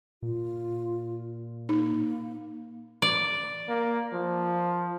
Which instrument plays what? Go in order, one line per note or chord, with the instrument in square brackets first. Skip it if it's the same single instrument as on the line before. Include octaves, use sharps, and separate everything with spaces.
[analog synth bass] A#2 [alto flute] F4
[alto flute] A#3 [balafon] D#4
[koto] D5
[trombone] A#3
F3